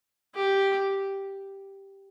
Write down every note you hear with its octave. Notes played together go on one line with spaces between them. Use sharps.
G4